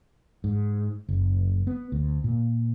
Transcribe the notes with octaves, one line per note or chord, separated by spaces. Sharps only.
G#2
F#1
B3
D2
A#2